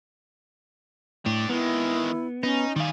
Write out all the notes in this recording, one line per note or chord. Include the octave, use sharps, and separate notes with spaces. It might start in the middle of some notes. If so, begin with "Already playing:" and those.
A2 D4 G4
D#3 G#3 B3 E4
B3 C#4 D#4
D#3 G3 G#4 F5